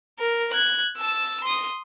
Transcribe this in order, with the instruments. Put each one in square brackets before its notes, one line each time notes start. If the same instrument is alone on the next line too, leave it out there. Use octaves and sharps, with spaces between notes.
[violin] A#4
F#6 G#6
A5 E6
C6 D#6